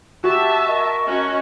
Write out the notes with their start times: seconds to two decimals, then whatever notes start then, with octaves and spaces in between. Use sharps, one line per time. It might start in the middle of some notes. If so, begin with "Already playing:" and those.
0.24 F#4 G4 E5 A5
0.67 A#4 D#5 C#6
1.08 C#4 F#4